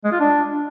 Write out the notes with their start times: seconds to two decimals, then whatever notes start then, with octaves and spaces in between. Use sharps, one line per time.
0.04 G#3
0.12 F4
0.20 D4